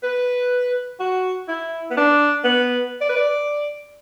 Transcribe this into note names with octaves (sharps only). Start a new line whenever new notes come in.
B4
F#4
E4
B3
D4
B3
D5
B4
D5